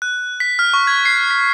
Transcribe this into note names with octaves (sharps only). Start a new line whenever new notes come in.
F#6
B6
F6
C#6
G#6
C7
B6